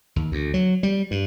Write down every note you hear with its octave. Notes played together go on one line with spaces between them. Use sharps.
D#2
D2
F#3
G3
G2